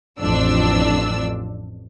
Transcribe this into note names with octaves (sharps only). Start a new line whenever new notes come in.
A1 F2 D4 E6